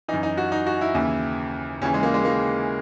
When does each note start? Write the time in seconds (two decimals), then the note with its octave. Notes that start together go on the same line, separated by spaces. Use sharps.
0.08 F#2 E3 D#4
0.23 D#4
0.38 F#4
0.52 D#4
0.67 F#4
0.81 E4
0.95 D#2 C#3 E3
1.81 D#2 C#3 E3 C#4
1.94 G#3
2.03 A#3
2.14 G#3
2.25 A#3